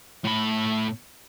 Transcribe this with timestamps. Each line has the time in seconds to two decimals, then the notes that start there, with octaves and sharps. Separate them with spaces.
0.24 A2 B5